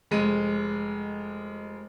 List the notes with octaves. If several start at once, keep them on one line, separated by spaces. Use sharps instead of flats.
F1 G#3 D#7